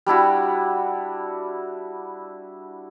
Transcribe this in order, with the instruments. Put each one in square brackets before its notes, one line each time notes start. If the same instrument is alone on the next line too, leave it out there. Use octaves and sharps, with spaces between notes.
[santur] G3 D4 E4 F#4